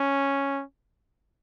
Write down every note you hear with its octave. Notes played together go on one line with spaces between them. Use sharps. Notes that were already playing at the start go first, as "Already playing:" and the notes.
Already playing: C#4